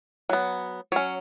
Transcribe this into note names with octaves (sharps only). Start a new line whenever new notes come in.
F#3 B3
F#3 C#4 C#5